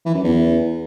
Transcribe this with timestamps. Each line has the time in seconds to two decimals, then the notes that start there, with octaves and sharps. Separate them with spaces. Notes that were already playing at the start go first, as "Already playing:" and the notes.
0.05 E3
0.14 F#2
0.24 E2